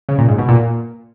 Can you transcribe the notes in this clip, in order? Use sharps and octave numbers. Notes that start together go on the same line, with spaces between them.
C#3
A#2
G#2
B2
A#2